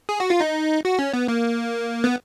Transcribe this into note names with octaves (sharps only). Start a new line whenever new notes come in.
G#4
F#4
F4
D#4
F#4
C#4
B3
A#3
B3